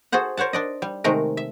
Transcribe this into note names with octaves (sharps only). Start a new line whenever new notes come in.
F#4 G#4 A4 C5 F#5
A#4 C5 C#5 F#5 A5
D4 D5 D#5
G3
C3 D#3 G#3 A3 A#4
E5